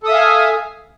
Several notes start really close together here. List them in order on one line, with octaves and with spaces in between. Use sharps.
A4 D#6 E5 F5 G#5